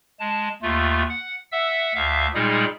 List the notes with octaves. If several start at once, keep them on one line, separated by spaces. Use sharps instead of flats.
G#3 A5
D#2 A3 F4
F#5
E5 F#5 E6
D2 E5 F5
A#2 G3 G#3 D#4 G#4